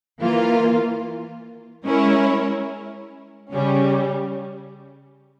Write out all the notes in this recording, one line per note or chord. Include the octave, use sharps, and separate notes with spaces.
E3 A#3 F4
G#3 C#4 E4 A#4 C#5
C#3 G3 C#4